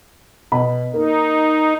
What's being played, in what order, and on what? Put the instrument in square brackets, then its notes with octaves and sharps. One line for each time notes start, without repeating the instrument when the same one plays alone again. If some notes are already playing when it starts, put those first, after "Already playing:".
[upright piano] B2 B3 B5
[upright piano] A#3 [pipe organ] D#4